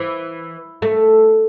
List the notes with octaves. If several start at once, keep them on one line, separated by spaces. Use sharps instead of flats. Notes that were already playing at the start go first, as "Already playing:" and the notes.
Already playing: E3
A3